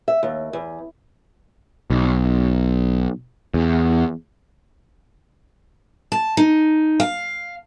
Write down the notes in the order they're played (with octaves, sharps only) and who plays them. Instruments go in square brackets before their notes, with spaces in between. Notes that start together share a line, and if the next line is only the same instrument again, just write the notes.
[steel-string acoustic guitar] E5
D#2
E2
[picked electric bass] B1
E2
[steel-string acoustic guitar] A5
D#4
F5